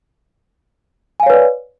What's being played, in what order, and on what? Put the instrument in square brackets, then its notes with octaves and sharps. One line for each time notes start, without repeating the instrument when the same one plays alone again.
[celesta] G#5
F5
C#5
B4
D5